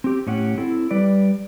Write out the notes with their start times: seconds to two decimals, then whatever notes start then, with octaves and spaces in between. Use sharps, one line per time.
0.04 C4 G4
0.27 A2 C#4 G4 F#5
0.58 C4 E4 A4
0.91 G3 B4 D5